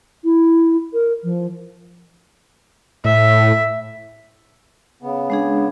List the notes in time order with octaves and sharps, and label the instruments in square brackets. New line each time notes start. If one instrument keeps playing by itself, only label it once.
[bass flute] E4
A#4
F3
[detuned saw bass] A2 [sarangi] E5
[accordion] C#3 B3
[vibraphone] G#3 D4 G#4